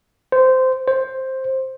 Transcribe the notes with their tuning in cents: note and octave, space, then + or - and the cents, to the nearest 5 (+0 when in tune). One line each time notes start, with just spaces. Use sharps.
C5 -15
C5 +10